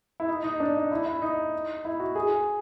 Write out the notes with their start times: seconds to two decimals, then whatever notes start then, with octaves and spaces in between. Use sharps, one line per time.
0.20 E4
0.29 D#4
0.44 D#4
0.60 D4
0.75 D#4
0.91 E4
1.06 E4
1.22 D#4
1.85 E4
2.00 F#4
2.15 G#4